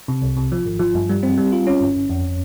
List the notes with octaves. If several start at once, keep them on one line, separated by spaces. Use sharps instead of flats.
C3
C2
C3
F3
G#1
F3
G2
G3
C4
G3
F4
C#4
G1
G1
F2